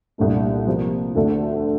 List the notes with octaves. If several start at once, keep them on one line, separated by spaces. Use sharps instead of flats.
C2 A#2 A3 D4
C3 F3 A#3
D2 D3 A3